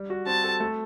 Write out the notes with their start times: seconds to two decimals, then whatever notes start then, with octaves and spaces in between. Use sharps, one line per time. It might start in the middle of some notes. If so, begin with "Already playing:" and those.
Already playing: G3
0.10 F#4
0.26 C4 A5
0.44 A4
0.60 A3